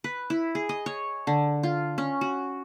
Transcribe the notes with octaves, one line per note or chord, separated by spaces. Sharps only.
B4
E4
G#4
D#5
C#5
D3
F4
C#4
F#4